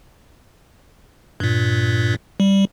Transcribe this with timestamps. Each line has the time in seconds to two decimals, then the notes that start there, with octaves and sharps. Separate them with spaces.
1.40 G2 A#2
2.40 G3